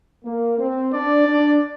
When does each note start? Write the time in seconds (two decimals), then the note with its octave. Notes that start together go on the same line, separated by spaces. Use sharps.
0.25 A#3
0.59 C4
0.94 D4 D5
1.27 D4